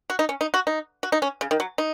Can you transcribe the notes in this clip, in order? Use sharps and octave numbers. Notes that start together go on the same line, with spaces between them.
F#4
D#4
C#4
D#4
F#4
D#4
F#4
D#4
C#4
C#3
D#3
F#3
D#4